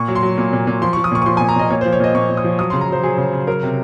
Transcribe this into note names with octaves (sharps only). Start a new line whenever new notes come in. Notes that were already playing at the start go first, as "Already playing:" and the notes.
Already playing: A#2 C#6
F#3
C6
F#3
A#2
A#2
A#2
F3 C6
C#6
F3
D#6
A#2 C#6
C#6
F3 C6
G#5
A#2
A#5
A#2 D#5
A#2 C#5
C5
F3
C#5
A#2 D#5
A#2 C#6
A#2
D#6
F3
F#3 D#6
C6
C#3
A#5
F#3 C5
F#3 G#4
C#3
C#3
F#3 A#4
C3